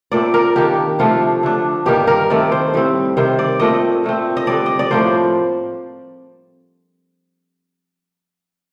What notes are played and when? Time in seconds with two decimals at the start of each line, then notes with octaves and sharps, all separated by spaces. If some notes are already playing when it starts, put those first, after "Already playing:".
0.12 A#2 A3 C4 D5
0.34 A#4
0.56 D#3 A#3 D4 G4
0.99 C3 F3 A3 D4 F4
1.43 D3 A3 D4
1.86 G2 D#3 G3 A#3 G4
2.07 A#4
2.30 D#3 A3 C4 D5
2.52 C5
2.74 A2 G3 C4
3.16 C3 D#3 G3 C5
3.39 D5
3.60 A#2 A3 C4 D#5
4.04 A#2 A3 C4
4.37 D#5
4.47 D3 G3 C4 D5
4.66 D#5
4.79 D5
4.91 A2 F3 A#3 C5